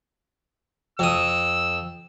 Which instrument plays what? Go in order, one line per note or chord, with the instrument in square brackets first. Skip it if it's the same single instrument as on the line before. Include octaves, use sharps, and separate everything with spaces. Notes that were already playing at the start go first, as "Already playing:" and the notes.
[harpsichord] F2 D#6 [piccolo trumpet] E6